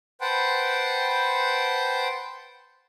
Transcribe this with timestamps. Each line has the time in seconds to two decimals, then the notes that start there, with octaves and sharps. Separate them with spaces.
0.21 B4 C5 F#5 G5 A5 C6